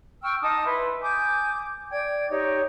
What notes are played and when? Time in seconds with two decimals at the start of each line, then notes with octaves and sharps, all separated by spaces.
0.22 G5 C#6 E6 F6
0.41 D#4 A5 D6 D#6
0.64 E4 B4 C6
1.02 G#5 D6 D#6 G6
1.90 D5 G5 G#6
2.30 D#4 G4 C#5